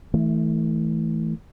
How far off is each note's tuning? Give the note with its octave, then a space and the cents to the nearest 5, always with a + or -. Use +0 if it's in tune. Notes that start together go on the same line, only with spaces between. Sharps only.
E3 -25 A3 +0